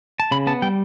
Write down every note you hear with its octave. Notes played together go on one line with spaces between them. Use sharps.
A5
C#3 B5
B3 A5
G3 G5